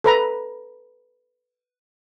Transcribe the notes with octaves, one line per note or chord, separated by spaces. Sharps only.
A4 B4 A#5